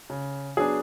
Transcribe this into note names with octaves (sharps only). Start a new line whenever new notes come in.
C#3
F#3 B3 D4 G#4